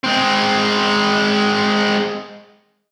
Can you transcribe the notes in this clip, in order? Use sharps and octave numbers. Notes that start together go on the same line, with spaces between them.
G#3 C4